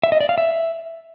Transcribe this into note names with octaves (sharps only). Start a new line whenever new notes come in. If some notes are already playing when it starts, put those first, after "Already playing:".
E5
D#5
D5
F5
E5